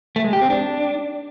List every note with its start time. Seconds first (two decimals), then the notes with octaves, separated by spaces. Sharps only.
0.16 A3
0.24 G#3
0.33 G4
0.41 C4
0.50 D4